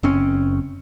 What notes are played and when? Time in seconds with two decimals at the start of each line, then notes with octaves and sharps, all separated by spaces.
0.03 F#1 C4 C#4